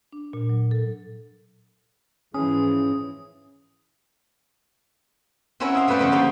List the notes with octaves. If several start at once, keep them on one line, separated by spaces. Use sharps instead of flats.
D4
A#2
F#3
A4
G#2 E3 F3 C#4 G#4 D#6
C4 C#4 E4 F#4 A#4 C#5
D#5 F5
F#2 A3 B3 B4 C5 D5
C#3 F3 A3
D3 A3 A#3 G4 F5